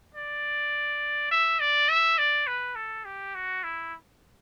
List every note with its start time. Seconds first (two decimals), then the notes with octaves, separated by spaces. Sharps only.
0.15 D5
1.31 E5
1.60 D5
1.89 E5
2.18 D5
2.47 B4
2.76 A4
3.05 G4
3.35 F#4
3.64 E4